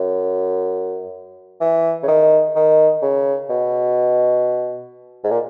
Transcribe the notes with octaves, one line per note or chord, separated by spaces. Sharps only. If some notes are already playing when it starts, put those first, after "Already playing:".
Already playing: F#2
E3
C#3
D#3
D#3
C#3
B2
G#2
A#2